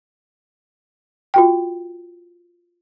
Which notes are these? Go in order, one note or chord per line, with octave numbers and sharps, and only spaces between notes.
F4 F#4 G5